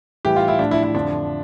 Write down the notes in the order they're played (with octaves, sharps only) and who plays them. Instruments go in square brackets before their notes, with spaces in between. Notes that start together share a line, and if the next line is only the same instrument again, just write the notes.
[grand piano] A2 E3 G3 G4
F4
E4
A2 F3 D4
E4
E4
F2 D3 F3 D4